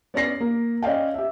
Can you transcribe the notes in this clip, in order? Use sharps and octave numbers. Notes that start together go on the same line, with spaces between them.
B3 C#4 D5 A#6 C7
A#3
C#4 D5 D#5 F5 G5
G4 E5